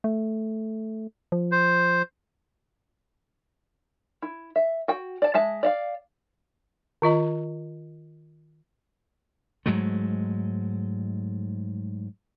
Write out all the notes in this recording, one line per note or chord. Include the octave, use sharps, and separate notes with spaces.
A3
F3
C5
E4
E5
F#4 G5
D5 A5
G#3 E5 A5
D5 D#5 F5
D#3 F4 D#5 A#5
G#2 F#3 G#3 A3